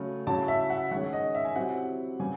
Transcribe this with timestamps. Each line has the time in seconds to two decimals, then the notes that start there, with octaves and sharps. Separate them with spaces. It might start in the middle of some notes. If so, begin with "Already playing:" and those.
Already playing: C#3 F#3 A3
0.27 C#3 F#3 C#4 E4 A5
0.48 E5
0.70 F#5
0.91 D#3 G#3 C#4 F#5
1.13 D#5
1.35 E5
1.45 G#5
1.55 C3 F#3 C4 E4 F#5
2.20 C#3 E3 G#5